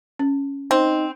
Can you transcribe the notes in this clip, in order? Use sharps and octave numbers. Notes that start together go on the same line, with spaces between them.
C#4
C4 D#4